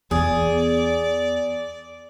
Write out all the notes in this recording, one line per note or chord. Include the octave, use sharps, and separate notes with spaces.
E2 B3 G#4 D5